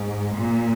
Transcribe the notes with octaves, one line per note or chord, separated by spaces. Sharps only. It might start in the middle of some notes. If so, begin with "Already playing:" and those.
Already playing: G#2
A#2